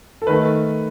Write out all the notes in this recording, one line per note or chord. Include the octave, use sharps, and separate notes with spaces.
A4
D#3 A3 B4